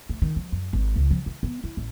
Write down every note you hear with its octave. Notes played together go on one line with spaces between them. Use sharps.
A3
D#3
F3
F#2
G#1
C#2
F3
E3
B3
E4
A1